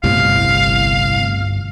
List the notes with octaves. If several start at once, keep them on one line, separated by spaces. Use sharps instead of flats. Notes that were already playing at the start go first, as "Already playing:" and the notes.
G1 C2 A2 C3 F5